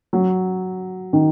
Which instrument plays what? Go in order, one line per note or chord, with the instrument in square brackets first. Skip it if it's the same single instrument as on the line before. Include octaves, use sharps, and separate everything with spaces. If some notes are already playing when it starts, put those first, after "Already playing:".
[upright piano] F#3
D#3